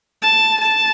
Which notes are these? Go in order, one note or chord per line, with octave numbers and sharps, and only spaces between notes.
A5
A5